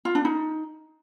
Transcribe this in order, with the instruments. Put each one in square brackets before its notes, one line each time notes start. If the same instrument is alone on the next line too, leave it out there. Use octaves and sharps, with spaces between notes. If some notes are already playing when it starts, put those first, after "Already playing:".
[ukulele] F4
D4
D#4